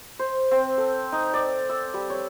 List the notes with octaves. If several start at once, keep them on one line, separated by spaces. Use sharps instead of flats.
C5
C4
A4
D#4
D5
E6
G3
C#5